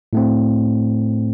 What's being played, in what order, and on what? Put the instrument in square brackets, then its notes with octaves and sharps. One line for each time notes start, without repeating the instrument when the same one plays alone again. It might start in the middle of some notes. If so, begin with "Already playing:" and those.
[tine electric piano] A2 A3 C4